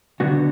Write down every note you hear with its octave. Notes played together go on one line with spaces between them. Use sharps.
D3 F#3 B3 F#4